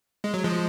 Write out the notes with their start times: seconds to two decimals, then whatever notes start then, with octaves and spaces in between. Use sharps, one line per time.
0.24 G#3
0.34 F#3
0.44 F3 G#3